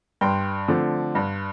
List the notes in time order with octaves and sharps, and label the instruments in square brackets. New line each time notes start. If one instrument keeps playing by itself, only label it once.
[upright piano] G2 G5 C6
D3 F3 A3 C4
G2